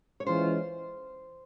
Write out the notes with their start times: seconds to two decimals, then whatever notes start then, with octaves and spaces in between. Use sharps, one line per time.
0.20 C#5
0.26 E3 G#3 C#4 F4 C5